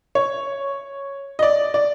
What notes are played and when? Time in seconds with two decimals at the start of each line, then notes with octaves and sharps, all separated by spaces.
0.15 C#5
1.39 D#5
1.42 D5
1.74 D5